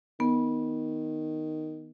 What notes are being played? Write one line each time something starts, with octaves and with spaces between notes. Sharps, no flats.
D#3 B3